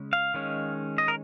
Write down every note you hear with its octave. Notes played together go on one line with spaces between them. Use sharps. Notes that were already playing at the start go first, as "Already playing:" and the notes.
Already playing: C#3 G#3 C#4
F5
D#3 G#3 C#4
D#5
A#4